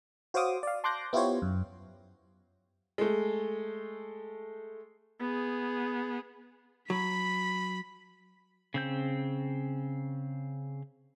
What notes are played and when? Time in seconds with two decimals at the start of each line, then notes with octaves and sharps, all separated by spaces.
0.34 F#4 C5 C#5 F5 D6 D#6
0.63 D5 F5
0.84 A5 C6 D6 F#6 G6 A#6
1.13 B3 E4 F4 G4 C5 C#5
1.42 F#2
2.98 G#3 A3
5.20 B3 G#4
6.90 F#3 B5 B6
8.74 C#3 C4 G6